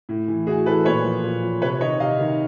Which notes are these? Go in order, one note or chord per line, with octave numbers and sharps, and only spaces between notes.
A2
E3
A2 F#4 G#4
E3 A4 B4
A#2 B4 C#5
F3
A#2
F3
C3 B4 C#5
D#3 C#5 D#5
C3 D#5 F5
D#3